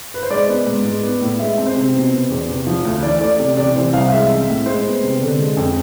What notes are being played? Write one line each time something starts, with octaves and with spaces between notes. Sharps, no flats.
B4
C5
G#3 D5
B3
G#2
G#3
B3
A2
G#3 E5
C4
C5
C3
B2
B3
E2
C3
F3
D2
E3 D5
A3 D5
C3 D5
C3 D5
E3 C5
C2 F5
F5
G#3 E5
C4
A2
G#3 C5
B3
C3
D3
G#3
F2